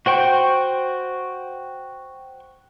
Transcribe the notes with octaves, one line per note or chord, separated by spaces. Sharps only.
F#4 C5 G5 C#6